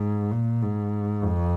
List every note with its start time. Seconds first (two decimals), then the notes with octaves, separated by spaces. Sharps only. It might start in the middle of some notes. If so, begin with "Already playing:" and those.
Already playing: G#2
0.32 A#2
0.62 G#2
1.22 F2